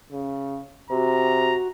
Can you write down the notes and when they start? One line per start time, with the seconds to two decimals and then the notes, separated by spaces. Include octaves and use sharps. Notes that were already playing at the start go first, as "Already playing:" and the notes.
0.12 C#3
0.90 C3 F#4 A#5